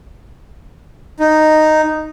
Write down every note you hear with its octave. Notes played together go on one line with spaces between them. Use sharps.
D#4